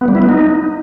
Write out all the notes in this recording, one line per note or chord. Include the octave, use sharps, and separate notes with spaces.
B3
G3
E4
B3
D#4